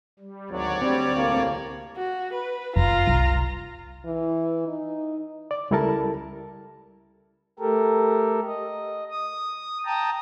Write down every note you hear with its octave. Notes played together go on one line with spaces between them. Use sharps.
G3
G#1 D2 F#3 C#5 D5
G3 C4
C2 A2 A#3
F#4
B4
F#1 F4 A#5
C2
E3
D#4
D5
C#2 G3 E4 A4 A#4 A5
A3 G4 A4 A#4
D#5
D#6
G5 A5 A#5 D#6